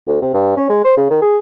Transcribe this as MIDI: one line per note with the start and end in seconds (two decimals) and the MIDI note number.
0.08 0.19 38
0.22 0.34 48
0.34 0.55 43
0.57 0.68 61
0.70 0.81 56
0.85 0.97 72
0.97 1.08 49
1.10 1.19 51
1.22 1.38 68